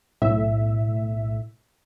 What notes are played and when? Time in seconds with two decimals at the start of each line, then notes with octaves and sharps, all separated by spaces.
0.22 B1 A2 E5